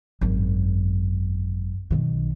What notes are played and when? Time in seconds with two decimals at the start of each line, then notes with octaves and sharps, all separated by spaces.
0.21 G#1 F#2
1.90 B1 D#3